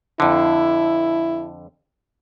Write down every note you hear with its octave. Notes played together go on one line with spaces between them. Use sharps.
F2 D3 E4